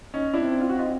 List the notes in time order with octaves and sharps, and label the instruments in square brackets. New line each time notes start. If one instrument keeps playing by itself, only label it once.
[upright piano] C#4 D#4
[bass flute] C4 [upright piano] D4 E4
[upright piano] F4
F#4
D#4 F4